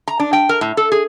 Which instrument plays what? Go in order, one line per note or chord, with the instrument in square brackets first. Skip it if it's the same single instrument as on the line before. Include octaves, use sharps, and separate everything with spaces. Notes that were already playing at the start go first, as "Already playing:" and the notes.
[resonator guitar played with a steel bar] A#5
D4
G5
A#4
A2
A4
G#4